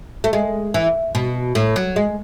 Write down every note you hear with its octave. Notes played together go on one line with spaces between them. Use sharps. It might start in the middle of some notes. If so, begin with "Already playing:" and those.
A3
G#3
E3
B2
A2
F#3
G#3